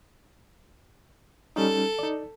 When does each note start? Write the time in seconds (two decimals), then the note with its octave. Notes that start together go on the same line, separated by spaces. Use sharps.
1.56 G3 C#4 D#4 A4
1.99 D#4 D5